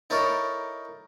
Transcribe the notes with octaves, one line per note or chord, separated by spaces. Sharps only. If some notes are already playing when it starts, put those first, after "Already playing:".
D#4 E4 A4 A#4 C#5 D5